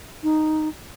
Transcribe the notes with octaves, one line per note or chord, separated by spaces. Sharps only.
D#4